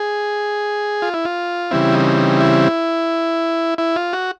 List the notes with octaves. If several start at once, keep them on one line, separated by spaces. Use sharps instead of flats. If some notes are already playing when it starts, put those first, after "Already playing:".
Already playing: G#4
F4
E4
F4
C#3 E3 G3 C4 E4
D#4
D#4
E4
E4
F4
F#4